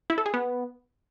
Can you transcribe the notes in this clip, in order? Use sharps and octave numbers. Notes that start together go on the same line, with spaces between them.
E4
A4
G#4
B3